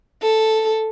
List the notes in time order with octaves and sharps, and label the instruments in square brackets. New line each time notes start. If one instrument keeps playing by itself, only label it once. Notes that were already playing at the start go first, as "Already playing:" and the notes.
[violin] A4